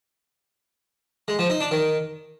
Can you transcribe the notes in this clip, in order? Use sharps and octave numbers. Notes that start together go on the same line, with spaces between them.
G#3
F3
D#4
D4
D#3